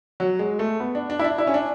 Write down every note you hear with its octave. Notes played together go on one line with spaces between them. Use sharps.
F#3
G#3
A3
B3
D4
D4
E4
D4
E4
C#4
D4